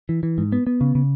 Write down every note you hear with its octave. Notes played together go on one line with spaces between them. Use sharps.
E3
E3
G#2
B3
B3
C#3
C#3